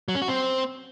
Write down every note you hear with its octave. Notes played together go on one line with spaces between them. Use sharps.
F#3
C#4
F#4
C4